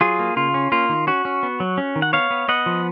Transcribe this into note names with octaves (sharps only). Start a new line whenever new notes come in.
F#3 F4 G#4
A#3
C#3 F4
C#4
A#3 F4
D#3
C#4 F#4
C#4
B3
F#3
C#4
D#3
F#5
B3 C#5 F5
B3
B3 D#5 F#5
F3